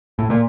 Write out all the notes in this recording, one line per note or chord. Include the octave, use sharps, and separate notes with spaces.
A2
A#2